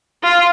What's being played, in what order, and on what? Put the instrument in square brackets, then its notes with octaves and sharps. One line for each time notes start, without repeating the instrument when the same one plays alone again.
[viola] F4